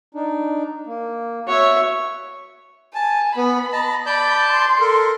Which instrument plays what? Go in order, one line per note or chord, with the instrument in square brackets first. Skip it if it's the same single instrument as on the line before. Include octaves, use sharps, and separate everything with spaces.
[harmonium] D4 D#4
A#3
[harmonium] F#4 F#5 [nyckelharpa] C#5 E5
[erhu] G#5 [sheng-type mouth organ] A5
[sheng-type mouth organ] B3 [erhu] B5
[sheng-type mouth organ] D#5 A5
[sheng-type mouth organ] D5 A5 G6 [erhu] B5
[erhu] C6
[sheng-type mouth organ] A4 A#4